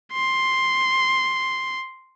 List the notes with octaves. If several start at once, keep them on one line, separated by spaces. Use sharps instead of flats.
C6